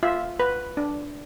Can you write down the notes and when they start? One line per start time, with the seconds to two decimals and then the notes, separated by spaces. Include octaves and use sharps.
0.03 F4 E5
0.40 B4
0.77 D4